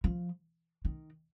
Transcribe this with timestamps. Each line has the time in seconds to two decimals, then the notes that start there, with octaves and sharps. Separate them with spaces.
0.04 F3
0.85 D#3